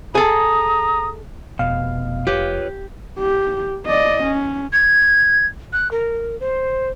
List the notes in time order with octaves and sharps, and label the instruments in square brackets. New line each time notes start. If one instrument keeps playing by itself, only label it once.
[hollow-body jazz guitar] G#4 A4 [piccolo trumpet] A#5 [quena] D#6
[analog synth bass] F1 [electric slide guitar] B2 [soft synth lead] F5
[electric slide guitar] F4 B4 C#5 [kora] G4
[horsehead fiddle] G4
D5 D#5
C#4
[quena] G#6
F#6
A#4
C5